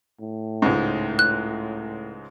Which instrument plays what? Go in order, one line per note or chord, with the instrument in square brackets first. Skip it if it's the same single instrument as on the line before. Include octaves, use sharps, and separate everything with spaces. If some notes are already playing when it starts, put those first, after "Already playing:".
[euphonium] A2
[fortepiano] C#2 G#2
[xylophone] F#6